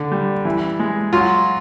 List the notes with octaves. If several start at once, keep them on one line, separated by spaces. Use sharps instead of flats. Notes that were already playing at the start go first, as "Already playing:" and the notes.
Already playing: D3
G3
E3
G#3
F#3 F4